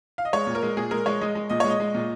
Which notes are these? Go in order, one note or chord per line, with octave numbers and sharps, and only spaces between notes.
F5
D#5
G#3 C#5
A#2
A#4
G#3
A#2 G#4
G#3 A#4
G#3 C#5
G#3 D#5
G#3
A#2 D#5
G#3 C#5
D#5
G#3
A#2